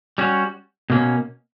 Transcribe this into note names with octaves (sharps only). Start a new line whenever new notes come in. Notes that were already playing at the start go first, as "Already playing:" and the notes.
G3 C#4 F#4
B2 A#3 C#4